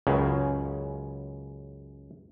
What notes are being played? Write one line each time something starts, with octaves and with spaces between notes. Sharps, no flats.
C#2 F#2 C#3